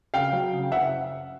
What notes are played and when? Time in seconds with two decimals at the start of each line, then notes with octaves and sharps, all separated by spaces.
0.14 C#3 F5 G5
0.33 F#3
0.52 C#3
0.72 F#1 E5 F#5